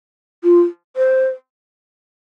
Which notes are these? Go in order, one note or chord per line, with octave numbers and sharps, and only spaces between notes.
F4
C5